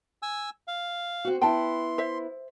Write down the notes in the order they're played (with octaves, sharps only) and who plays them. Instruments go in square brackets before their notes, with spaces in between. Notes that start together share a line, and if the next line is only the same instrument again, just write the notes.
[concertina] G#5 E6
F5
[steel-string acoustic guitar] C4 F#4
[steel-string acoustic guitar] B3 E4 [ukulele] G5 A5 [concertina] C6
[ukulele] C5 E5